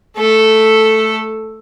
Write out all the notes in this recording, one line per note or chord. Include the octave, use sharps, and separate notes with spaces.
A3 A4